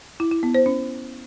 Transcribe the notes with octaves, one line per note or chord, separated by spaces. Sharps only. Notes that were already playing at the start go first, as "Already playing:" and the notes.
E4
E4
B3
C5
C#4